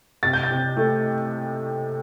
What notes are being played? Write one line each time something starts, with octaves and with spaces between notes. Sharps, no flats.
C3 A6
G6
A6
C3
A3